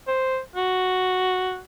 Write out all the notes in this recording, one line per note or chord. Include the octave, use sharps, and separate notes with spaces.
C5
F#4